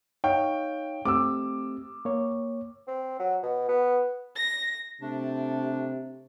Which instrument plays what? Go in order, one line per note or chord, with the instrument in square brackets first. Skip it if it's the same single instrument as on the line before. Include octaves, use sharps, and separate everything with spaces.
[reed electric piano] D#4 C#5 F5 [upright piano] G5
[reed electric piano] A3 C4 G4 [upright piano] D6 E6
[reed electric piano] A#3 C#5
[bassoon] C4
F#3
B2
B3
[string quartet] A#6
[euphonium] C3 [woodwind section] A3 D4